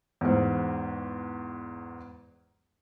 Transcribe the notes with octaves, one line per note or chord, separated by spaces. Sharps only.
E2 G#2